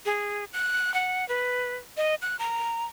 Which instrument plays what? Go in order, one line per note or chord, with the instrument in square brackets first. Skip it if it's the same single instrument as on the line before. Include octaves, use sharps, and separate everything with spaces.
[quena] G#4
F#6
F#5
B4
D#5
F#6
A#5